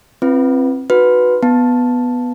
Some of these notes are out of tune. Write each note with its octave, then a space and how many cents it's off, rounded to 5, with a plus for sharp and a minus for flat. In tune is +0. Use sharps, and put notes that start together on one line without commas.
C4 +15 F4 -35 B4 +0
D#4 -15 F#4 -10 B4 +0
B3 +0 A5 +0